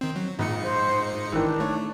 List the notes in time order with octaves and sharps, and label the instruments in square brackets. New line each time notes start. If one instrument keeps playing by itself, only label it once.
[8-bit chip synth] D#3 C4
F#3
[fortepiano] A#1 [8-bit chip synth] G#2 D#4 C#7
[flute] C5
[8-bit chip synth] G#1 [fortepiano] D#3 E3 [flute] D4
[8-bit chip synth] A3 [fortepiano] C#5